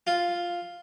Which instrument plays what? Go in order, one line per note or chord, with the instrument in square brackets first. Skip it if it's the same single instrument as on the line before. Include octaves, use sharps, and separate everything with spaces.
[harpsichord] F4